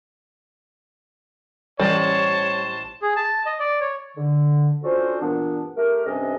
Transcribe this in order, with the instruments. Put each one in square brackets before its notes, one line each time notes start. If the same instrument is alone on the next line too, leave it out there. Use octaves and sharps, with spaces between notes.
[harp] A1 D#5 D#7 [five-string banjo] G3 [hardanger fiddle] C5 A5 [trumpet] C#5
[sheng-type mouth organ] G#4
A5
D#5
D5
C#5
[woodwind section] D3
C#4 D4 F4 F#4 A4 C5
G2 A#2 E3 B3 D4
A3 G4 A#4
G2 C3 C#4 D4 A4 D#5